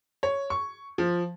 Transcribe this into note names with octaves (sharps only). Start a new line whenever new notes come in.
C#5
C#6
F3